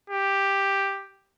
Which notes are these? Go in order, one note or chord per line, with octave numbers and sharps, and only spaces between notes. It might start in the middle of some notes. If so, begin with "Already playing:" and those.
G4